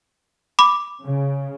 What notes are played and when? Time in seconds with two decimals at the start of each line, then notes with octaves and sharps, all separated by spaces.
0.59 B5 D6
1.04 C#3